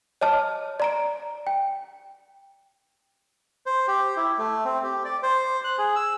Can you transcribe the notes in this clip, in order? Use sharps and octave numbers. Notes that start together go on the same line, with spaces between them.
C#5 D#5 A5 F6
D5 A#5 D7
G5
C5
G4
E4
A3
C4
G4
D5
C5
F#6
G#4
E6